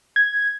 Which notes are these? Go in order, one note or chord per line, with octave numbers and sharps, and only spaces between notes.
G#6